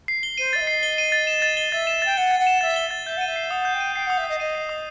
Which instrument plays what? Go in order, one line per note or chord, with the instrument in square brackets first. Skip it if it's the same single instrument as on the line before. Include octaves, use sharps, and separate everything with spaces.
[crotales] C7
G7
[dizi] C5 [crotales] D#7
[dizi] E5 [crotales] A6
[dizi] D#5
[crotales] C7
G7
D#7
A6
E7
A6
G7
[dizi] E5 [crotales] A6
[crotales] E7
[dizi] G5 [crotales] A6
[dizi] F#5 [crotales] G7
[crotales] A6
[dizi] F#5
[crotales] E7
[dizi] E5 [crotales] A6
[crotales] G7
A6
[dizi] E5 [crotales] G6
[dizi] F#5 [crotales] D#7
[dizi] E5
[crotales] C7
[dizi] F#5 [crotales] D#6
[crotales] G6
[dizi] G5
[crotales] D#7
[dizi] G5 [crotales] C7
[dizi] F#5 [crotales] D#6
[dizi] E5
[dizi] D#5 [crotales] G6
[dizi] D#5 [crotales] D#7
[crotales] C7
D#6